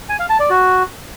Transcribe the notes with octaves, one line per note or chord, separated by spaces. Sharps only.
G#5
F5
A5
D5
F#4